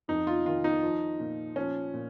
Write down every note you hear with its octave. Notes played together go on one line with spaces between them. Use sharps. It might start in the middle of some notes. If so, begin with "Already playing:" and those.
F2 D#4
F4
D#3 F4
D#4
F3
A#2
F3 C#4
A#2